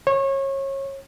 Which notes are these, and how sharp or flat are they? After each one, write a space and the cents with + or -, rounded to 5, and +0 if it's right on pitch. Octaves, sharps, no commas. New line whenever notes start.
C#5 -30